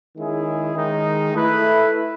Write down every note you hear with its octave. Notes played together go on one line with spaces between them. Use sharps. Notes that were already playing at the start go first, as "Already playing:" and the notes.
D#3 G#3 C#4 E4 G#4
D#3 G#3 D#4
A3 E4 B4